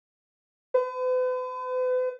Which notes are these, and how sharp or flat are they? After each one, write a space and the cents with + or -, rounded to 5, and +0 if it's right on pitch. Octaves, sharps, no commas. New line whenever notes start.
B4 +45